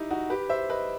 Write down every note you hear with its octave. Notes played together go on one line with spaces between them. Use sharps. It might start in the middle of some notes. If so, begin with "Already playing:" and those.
Already playing: D#4 E4 G4
D#4 F#4
G4 B4
C5 E5
B4 D#5